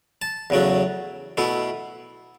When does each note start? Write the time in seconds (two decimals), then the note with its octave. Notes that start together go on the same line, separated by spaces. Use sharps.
0.22 A5
0.50 E2 C#3 F#3 A3
1.37 B2 A3 E4